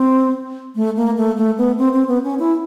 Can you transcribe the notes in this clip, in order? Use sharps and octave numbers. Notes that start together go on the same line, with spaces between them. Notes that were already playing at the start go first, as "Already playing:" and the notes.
Already playing: C4
A3
A#3
A3
A3
B3
C4
C4
B3
C#4
E4